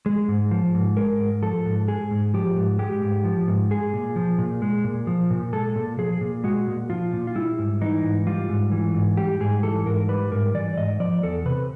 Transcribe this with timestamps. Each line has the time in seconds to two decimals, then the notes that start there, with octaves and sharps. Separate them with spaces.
0.06 G#3
0.28 G#2
0.51 F3
0.74 G#2
0.97 G#3 A#4
1.20 G#2
1.42 F3 A4
1.66 G#2
1.88 G#3 G#4
2.11 G#2
2.34 F3 G4
2.56 G#2
2.79 G#3 G4
3.02 G#2
3.25 F3
3.48 G#2
3.71 G#3 G#4
3.93 A#2
4.16 F3
4.39 A#2
4.62 G#3
4.84 A#2
5.07 F3
5.30 A#2
5.53 G#3 A4
5.76 A#2
5.98 F3 G#4
6.21 A#2
6.44 G#3 F#4
6.67 A#2
6.90 F3 F4
7.13 A#2
7.27 F4
7.35 G3 E4
7.59 G#2
7.81 E3 D#4
8.04 G#2
8.27 G3 F4
8.50 G#2
8.72 E3
8.94 G#2
9.17 G3 G4
9.40 G#2 G#4
9.63 E3 A4
9.86 G#2 A#4
10.09 G3 B4
10.32 G#2 A#4
10.54 E3 D5
10.77 G#2 D#5
11.00 F3 D5
11.23 E2 A4
11.46 C3 B4